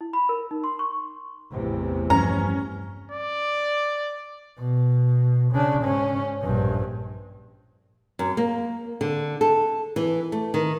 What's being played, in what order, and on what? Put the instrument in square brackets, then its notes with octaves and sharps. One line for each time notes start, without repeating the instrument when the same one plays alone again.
[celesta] E4
B5
A#4
D#4
C6
C#6
[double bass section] A1 E2 C3
[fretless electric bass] G2 F3 [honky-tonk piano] C#4 [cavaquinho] A#5
[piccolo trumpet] D5
[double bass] B2
C#3 D4
G#2 C#4
A#1 G2
[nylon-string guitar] F#2
A#3
D3
A4
E3
A3
D#3